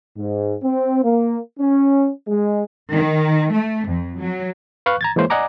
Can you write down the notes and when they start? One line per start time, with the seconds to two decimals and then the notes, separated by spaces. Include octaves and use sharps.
0.17 G#2
0.64 C4
1.04 A#3
1.60 C#4
2.28 G#3
2.92 D#3
3.52 A3
3.87 F2
4.19 F#3
4.86 B4 F5 C#6 F#6
5.01 A#5 G#6 A6
5.16 E3 G#3 A#3 C5 C#5
5.30 D5 D#5 F#5 G#5 A#5 D6